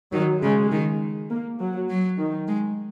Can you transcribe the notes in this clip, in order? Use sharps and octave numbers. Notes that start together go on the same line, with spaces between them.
D#3 F#3
C#3 G#3
D#3
A#3
F#3
F#3
D#3
G#3